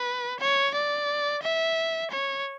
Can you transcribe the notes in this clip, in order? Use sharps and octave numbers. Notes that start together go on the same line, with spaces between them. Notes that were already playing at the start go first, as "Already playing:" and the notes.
Already playing: B4
C#5
D5
E5
C#5